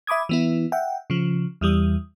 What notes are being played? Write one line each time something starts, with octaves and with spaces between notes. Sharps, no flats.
E5 B5 D6 D#6 G#6
E3 B3 E4
E5 F#5 G5
C#3 F3
E2 E3 G3 D#6